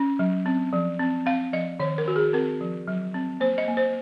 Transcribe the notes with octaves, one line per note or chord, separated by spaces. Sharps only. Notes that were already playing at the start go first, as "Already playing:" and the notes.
Already playing: C#4
F#3
C4
F3
C4
C4 F5
F3 D#5
D#3 C#5
A#4
D#3 F#4
G#4
C4 A#4
F3
F#3
C4
A#3 C5
D#5
A#3
C5